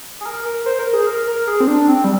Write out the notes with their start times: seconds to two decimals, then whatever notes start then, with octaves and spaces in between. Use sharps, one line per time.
0.21 G#4
0.26 A#4
0.46 A#4
0.66 C5
0.79 A#4
0.93 G#4
1.07 A#4
1.27 A#4
1.47 G#4
1.60 C4
1.68 D4
1.88 C4
2.04 G3